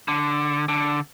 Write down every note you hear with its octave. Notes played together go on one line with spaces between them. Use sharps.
D3
D3